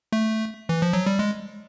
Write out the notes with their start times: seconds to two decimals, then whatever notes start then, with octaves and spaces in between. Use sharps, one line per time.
0.13 A3
0.69 E3
0.82 F3
0.93 F#3
1.06 G3
1.19 G#3